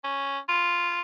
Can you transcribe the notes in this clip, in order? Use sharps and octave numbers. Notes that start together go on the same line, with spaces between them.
C#4
F4